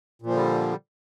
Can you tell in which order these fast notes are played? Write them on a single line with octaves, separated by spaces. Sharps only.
A#2 F3 D3 G3